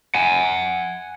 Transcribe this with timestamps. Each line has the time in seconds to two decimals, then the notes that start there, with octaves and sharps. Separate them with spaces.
0.15 F#5 G#5